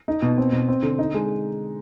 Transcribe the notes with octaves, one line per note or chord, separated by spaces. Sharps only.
D#4
B2
C4
B2
C4
D3
D#4
G#3